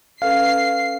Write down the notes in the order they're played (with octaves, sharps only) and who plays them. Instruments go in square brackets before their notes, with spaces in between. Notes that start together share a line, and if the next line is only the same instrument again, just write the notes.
[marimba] C#4 A4 B4 [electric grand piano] F5 [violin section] C7